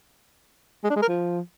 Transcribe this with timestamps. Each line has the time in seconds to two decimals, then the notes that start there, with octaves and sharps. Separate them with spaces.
0.84 G#3
0.90 D4
0.96 G#3
1.02 A#4
1.08 F3